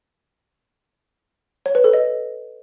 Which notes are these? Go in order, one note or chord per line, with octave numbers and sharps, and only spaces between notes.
C#5
B4
A4
D#5